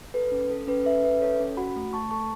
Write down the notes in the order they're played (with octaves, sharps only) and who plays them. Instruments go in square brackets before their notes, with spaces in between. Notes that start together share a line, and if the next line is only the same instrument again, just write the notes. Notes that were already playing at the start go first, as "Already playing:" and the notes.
[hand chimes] A4 B4
C#4
A4
C#4 B4
A4 B4 E5
C#4 B4 E5
A4 C#5
C#4
F#4 F#5 B5
A3
A3 A5 C#6
A4 A5 C#6